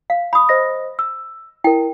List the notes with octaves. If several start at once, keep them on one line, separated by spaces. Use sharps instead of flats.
F5
B5 D#6
C5 D#5 A#6
E6
E4 A#4 G5